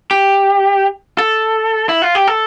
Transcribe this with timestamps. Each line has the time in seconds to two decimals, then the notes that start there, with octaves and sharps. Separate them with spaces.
0.11 G4
1.18 A4
1.89 E4
2.02 F4
2.15 G4
2.28 A4